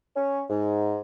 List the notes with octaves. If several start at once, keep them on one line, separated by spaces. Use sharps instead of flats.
C#4
G#2